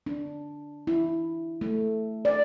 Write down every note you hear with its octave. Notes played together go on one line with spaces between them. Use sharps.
D4
E4
A3
D5